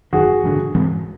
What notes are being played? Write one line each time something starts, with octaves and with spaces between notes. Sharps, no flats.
G1 F#2 D#3 F#4 G#4
A1 G2 D3
G#2 E3 G#3 C4